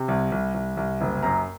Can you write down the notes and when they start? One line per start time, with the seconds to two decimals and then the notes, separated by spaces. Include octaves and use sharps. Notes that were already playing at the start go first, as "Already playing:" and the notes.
Already playing: C3
0.08 C2
0.32 C2
0.54 C2
0.77 C2
1.01 F#1
1.23 F#2 A#5